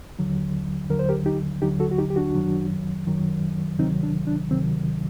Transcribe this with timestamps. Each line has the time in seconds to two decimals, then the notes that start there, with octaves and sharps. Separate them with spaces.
0.19 D#2 D3 F#3
0.90 D#2 D3 F#3 A#4
0.99 C5
1.09 G4 A#4
1.26 D#4 G4
1.62 D#2 D3 F#3 D#4 G4
1.80 F#4 A4
1.91 F#4
1.98 D#4 G4
2.10 G4
2.16 D4 F#4
2.35 F#2 D#3 F#3
3.07 F#2 D#3 F#3
3.79 D2 C3 D#3 F#3 C4 D#4
4.03 D4
4.27 D4
4.51 D2 C3 D#3 F#3 C4